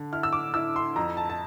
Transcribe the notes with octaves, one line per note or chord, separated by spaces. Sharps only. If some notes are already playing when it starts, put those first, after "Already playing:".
Already playing: D3
E4 F6
E6
D6
E4 E6
C6
F2 A#5
A5
A5